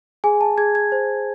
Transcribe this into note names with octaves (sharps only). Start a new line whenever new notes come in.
G#4 G#5
A5
G#4 G#6
G#6
C5